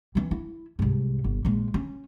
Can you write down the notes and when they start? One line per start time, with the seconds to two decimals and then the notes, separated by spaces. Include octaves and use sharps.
0.15 E3 C4
0.31 E4
0.79 C2 G#2
1.24 G1
1.45 A#1 G#3
1.74 C#4